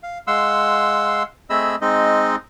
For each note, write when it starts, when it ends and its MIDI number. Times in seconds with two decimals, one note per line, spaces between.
0.03 0.18 77
0.27 1.23 56
0.27 1.23 77
0.27 1.23 78
0.27 1.23 84
0.27 1.23 88
1.50 1.75 57
1.50 1.75 60
1.50 1.75 68
1.50 1.75 75
1.50 1.75 83
1.50 1.75 88
1.81 2.36 56
1.81 2.36 60
1.81 2.36 63
1.81 2.36 75